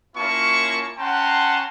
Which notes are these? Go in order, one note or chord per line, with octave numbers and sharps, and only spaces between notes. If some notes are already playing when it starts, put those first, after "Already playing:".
A#3 C#4 E4 F4 A5 C#6
C#4 F#5 G5 A5 A#5 C6